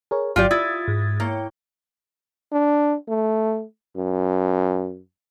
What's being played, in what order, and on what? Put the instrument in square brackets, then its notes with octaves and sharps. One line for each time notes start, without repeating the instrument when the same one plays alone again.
[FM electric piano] G#4 A#4 C#5
[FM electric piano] G1 F#3 G6 [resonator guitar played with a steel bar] F4 G4 D5
[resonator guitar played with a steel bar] E4 [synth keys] F4 [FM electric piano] D#6 G#6 A6
[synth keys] G#2
[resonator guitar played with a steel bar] A#3 [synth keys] E4 C#5 G5
[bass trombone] D4
A3
F#2